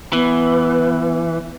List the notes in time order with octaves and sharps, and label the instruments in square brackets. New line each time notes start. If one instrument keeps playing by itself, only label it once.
[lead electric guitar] E3 [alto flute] B3